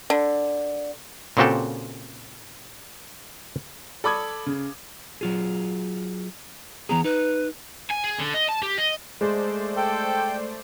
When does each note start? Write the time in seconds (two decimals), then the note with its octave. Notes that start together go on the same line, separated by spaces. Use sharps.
0.10 D3
1.37 A#2 C#3 C4 F#4 G4 A4
4.04 A4 D5 B5 D6 D#6 G#6
4.46 C#3
5.21 F#3 F4 G#4
6.89 E3 B3 G#4 A#5
7.04 D#4 B4
7.91 G#5
8.04 G#4
8.19 D3
8.34 D#5
8.49 A5
8.63 G4
8.78 D#5
9.21 G#3 A3 C5 D5
9.77 A4 G5